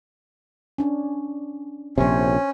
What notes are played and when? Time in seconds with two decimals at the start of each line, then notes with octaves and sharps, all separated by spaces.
0.78 C#4 D4
1.98 A#1 C3 C#4 C5 C#5